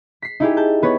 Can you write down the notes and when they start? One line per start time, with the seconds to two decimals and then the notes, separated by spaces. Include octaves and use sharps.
0.22 B6 C7
0.40 D#4 E4 G4 G#4
0.57 A5 G6
0.83 B3 B4 C#5